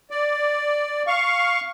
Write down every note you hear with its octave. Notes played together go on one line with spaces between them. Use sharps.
D5
F5 C#6